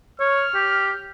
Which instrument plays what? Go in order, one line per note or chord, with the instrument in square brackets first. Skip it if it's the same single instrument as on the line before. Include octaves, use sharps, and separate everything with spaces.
[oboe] C#5 [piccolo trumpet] F6
[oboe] G4